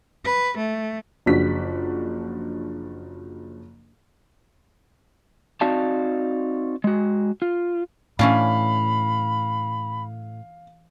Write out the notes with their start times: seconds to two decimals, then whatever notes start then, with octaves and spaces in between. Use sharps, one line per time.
0.25 B4
0.58 A3
1.26 F#1 F3 D4 F#4 B6
5.61 C4 D#4 F#4 D5 F5 A5
6.84 G#3 F#4
7.42 F4
8.19 A2 E3 C#4 D4 F5 B5